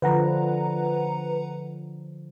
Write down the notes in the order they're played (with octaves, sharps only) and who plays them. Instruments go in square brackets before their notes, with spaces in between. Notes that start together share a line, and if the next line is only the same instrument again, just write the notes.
[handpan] D3 F3 [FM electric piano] B4 F#5 A#5